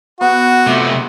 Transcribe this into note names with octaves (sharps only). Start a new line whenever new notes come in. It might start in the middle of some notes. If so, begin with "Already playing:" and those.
B3 F#4
C3 A3